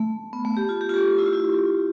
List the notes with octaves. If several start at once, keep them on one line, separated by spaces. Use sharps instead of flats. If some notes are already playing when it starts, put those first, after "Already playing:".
Already playing: A3
B3
A3
G4
F4
G4
F4
G4
F4
E4
F4
E4